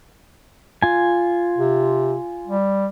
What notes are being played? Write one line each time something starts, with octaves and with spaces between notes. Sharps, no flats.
F4 G#5
C3
G3